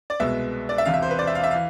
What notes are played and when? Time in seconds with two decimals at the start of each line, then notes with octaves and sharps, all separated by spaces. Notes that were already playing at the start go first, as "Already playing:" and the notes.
0.10 D5
0.20 C2 B2 G#3 B3 E5
0.69 D5
0.78 E5
0.85 E1 E2 C3 F5
0.94 E5
1.02 C5
1.11 B4
1.19 D5
1.27 E5
1.35 F5
1.44 E5
1.51 E3 F5